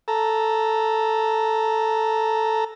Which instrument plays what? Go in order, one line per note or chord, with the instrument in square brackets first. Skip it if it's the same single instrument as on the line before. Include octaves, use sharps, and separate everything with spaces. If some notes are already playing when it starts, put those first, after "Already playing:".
[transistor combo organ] A4 A#5